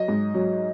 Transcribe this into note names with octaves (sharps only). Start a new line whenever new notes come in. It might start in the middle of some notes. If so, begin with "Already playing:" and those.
Already playing: F#3 D#5
G#2
F#3